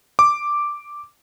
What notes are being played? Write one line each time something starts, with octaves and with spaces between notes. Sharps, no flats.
D6